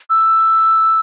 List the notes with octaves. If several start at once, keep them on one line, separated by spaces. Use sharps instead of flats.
E6